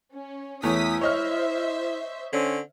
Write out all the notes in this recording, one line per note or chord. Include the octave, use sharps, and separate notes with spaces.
C#4
E2 A3 E4 C#5 D#6 B6
C5 C#5 D#5 E5 F6
D3 C4 C#4